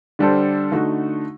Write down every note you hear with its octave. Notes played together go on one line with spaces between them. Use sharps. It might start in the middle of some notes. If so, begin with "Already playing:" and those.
D3 G3 D4 A4 C5
D3 A3 D#4 F#4